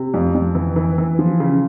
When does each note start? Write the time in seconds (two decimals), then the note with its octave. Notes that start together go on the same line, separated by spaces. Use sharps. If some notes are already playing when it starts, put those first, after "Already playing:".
Already playing: C3
0.14 F2
0.35 F2
0.55 E3
0.76 E3
0.98 E3
1.19 F3
1.40 C#3